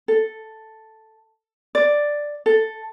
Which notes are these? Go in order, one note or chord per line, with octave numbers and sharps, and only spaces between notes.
A4
D5
A4